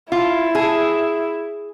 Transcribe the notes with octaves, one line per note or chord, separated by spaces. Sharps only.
E4 F4
G#4